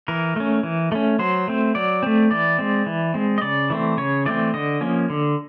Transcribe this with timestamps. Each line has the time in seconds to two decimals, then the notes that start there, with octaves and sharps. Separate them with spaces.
0.08 E3 A#4
0.36 A3 C#4
0.63 E3
0.92 A3 C#4
1.19 F#3 C5
1.48 A3 C4
1.75 F#3 D5
2.03 A3 C4
2.31 E3 D5
2.59 G#3 C4
2.86 E3
3.14 G#3 C4
3.38 D#5
3.42 C#3 D5
3.70 E3 A3 C4
3.97 C#3 C#5
4.26 E3 A3 C4 D5
4.54 D3 D#5
4.81 F3 A#3 C#4
5.10 D3